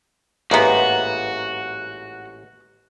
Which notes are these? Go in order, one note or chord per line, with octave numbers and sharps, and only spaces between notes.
A1 G#2 A#3 B3 F#4 G#4 E5 A#5